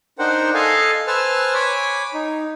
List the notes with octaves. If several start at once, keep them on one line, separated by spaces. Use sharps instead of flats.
D4 D#4 A#4 C5 F#5 G5
A4 D#5 F5 G#5
B4 C5 G#5 A5 E6 F6
C#5 G#5 B5 D6
D#4